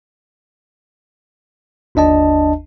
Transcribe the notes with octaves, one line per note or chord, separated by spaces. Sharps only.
G1 D#2 D4 D#5 A5